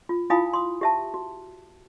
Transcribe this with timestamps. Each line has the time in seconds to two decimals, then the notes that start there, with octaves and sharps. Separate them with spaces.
0.09 F4
0.30 E4 F4 F5 G#5 B5 D#6
0.53 C6 D#6
0.81 G4 E5 A5
1.14 F#4